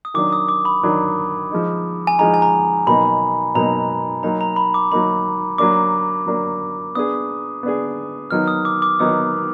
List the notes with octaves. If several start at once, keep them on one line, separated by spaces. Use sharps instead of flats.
D#6
D#3 F#3 D4 D6
D#6
D6
B5
D#3 F#3 D4
F3 G#3 D#4
G#5
F3 G#3 D#4 A#5
G#5
A#5
B2 F#3 A#3 D#4 B5
B2 F#3 A#3 D#4 A#5
F#3 A#3 D#4 A#5
A#5
B5
D6
F#3 A#3 D#4 B5
F#3 A#3 D4 D6
F#3 A#3 D4
B3 D4 G#4 D#6
B3 D4 G#4
D#3 F#3 B3 D#4 F6
D#6
D6
D6
D#3 F#3 B3 D#4 D#6